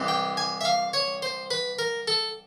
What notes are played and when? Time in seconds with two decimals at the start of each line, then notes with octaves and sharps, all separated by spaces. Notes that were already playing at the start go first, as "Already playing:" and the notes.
Already playing: C2 C3 E3 G#3
0.08 G5
0.37 G#5
0.61 E5
0.65 F5
0.93 C#5
1.22 C5
1.51 B4
1.79 A#4
2.08 A4